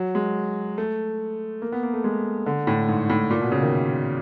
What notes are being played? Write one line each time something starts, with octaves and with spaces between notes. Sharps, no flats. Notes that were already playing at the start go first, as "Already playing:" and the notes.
Already playing: F#3
G#3
A3
A#3
B3
A#3
A3
G#3
D3
A2
G#2
A2
A#2
B2
C#3
D#3